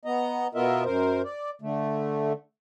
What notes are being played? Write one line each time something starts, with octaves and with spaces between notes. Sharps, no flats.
B3 D#5 A#5
B2 B3 F4 A#4 D#5 E5
F#2 A#4 C5
D5
D3 A3